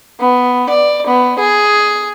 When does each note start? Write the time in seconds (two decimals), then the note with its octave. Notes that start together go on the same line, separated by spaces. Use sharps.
0.20 B3
0.69 D5
1.07 B3
1.39 G#4